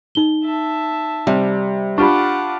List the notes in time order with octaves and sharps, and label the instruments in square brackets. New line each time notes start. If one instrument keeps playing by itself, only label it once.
[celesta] D#4 G7
[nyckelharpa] E5 A5
[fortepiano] C3 [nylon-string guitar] G3
[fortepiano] D4 F4 G4 [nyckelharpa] F#5 D6 [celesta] B5 C#6